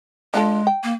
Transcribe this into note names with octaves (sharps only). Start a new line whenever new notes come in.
G#3 D4 F4 A4
G5
A#3